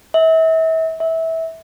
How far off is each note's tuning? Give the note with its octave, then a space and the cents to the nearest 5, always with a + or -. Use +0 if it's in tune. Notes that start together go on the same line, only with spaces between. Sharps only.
E5 -35
E5 -20